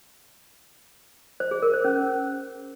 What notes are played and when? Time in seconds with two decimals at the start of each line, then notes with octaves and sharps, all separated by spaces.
1.40 C5
1.51 G#4
1.62 A#4
1.73 C5
1.85 C#4